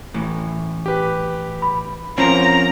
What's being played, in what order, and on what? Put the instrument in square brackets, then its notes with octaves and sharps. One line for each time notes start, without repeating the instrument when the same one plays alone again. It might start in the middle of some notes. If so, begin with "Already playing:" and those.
[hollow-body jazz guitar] A2 E3
[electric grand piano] G4 B4
[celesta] B5
[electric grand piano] F3 C#4 [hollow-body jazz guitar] C4 A#4 [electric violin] A#5